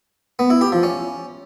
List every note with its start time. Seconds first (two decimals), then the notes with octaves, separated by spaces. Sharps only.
0.39 B3
0.50 E4
0.61 G4
0.72 F3
0.83 C#4